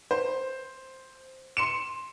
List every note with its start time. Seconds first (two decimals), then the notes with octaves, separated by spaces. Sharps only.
0.11 C5
1.57 C6 C#7 E7